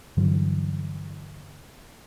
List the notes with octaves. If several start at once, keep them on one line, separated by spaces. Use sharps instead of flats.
G2 D3 E3 F#3